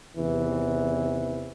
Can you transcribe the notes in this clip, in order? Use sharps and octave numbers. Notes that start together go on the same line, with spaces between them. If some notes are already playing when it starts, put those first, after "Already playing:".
E2 C3 D#3 E3